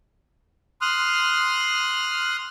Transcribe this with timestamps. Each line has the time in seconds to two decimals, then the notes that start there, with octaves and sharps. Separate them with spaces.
0.82 C6 D#6 F6 F#6